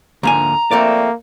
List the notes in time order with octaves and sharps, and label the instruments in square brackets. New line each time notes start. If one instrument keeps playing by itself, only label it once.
[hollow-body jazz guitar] D2 A#3 G#5 [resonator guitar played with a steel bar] G#2 D3 F3 [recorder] A#5
[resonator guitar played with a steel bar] F3 A3 C4 [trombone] A#3 [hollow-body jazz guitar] D5